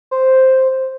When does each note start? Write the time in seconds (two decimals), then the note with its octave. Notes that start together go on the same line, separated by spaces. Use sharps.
0.11 C5